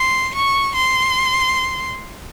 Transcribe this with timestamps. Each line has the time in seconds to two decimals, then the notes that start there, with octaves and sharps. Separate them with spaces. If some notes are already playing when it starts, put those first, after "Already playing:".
Already playing: C6
0.34 C#6
0.75 C6